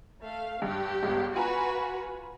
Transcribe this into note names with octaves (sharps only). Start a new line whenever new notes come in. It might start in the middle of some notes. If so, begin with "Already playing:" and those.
A3 F5
G2 G4
G1 C#2 G2
F4 F#4 B4 G#5 A#5